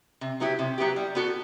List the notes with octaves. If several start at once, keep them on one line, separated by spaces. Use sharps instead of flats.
C3
F#3 B3 E4 G4
C3
F#3 B3 E4 G4
G3
B3 F#4 A4